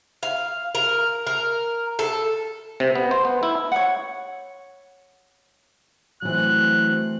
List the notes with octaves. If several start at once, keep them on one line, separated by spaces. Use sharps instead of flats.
F5
A#4
A#4
A4
C3
B3
C5
B3
E4
C#5 F#5
E3 F#3 A3 C4 F#6